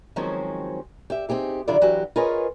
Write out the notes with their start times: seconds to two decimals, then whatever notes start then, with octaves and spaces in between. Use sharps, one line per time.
0.16 D#3 F3 F#3 G#3 C4 C#4
1.10 G4 E5
1.29 C4 D#4 G4 G#4
1.68 D3 D#3 F#3 E4 F4 D5
1.81 E3 F#3 F#4 G4
2.16 F4 G#4 A#4 B4 C#5 D#5